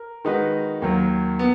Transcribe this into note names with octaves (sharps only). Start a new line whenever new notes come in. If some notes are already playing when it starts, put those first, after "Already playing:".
Already playing: A#4
D#3 G#3 D#4 F#4 B4
D#2 D#3 F#3
B3